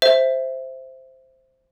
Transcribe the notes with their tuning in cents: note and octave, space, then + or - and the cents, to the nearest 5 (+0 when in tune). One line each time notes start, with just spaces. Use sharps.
C5 +0 E5 +0